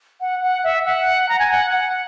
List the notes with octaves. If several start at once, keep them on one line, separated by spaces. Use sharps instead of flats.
F#5
F#5
E5
F#5
A#5
G#5
F#5
F#5